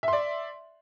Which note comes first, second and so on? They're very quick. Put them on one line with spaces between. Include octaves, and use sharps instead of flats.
E5 C6 D5